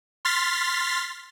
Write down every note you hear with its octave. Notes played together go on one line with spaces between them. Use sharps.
C6 F6 A6 B6